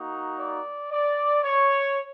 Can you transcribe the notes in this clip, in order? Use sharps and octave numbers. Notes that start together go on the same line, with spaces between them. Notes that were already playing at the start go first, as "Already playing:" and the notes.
Already playing: A#3 D#4 F#4
D5
D5
C#5